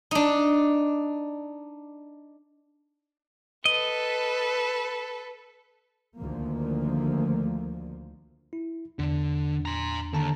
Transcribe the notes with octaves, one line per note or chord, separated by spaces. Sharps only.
D4 D#4
A4 B4 D#5
D2 D3 D#3 F3 A#3
E4
E2 D3 D4
A#5 C6
D#2 D3 A5 A#5